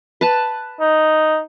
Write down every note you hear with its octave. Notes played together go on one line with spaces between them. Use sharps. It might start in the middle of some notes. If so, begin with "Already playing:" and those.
B4 A5
D#4